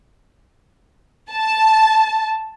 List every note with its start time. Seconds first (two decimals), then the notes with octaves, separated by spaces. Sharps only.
1.32 A5